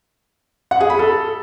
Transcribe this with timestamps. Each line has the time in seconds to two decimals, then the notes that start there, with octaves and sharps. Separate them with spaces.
0.71 F#5
0.80 G#4
0.90 B5
0.99 A4